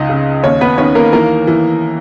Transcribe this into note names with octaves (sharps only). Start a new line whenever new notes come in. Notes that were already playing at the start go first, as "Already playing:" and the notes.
Already playing: C#2 D#4 D#5
C#3
D#2 C#4 C#5
B3 B4
D#3 C#4 C#5
A#3 A#4
E3 A#3 A#4
E3